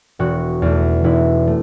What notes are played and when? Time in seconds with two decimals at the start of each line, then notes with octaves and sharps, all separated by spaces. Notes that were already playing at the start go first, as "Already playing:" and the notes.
0.19 E1 F#4
0.62 E2 B2 A3
1.04 E1 E4
1.47 A3